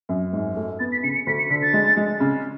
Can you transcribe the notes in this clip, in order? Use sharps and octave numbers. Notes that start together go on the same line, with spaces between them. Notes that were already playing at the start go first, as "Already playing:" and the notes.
F#2
G#2
A3
B3 A6
B6
C#3 C#7
C#7
D2 B6
C#7
D3 B6
A6
G#3
G#3
C#3